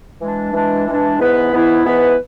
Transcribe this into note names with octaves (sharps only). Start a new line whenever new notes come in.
E3 G#3 D4
E3 G#3 D4
E3 G#3 D4
G#2 E3 B3 E4 B4
G#2 E3 B3 E4 B4
G#2 E3 B3 E4 B4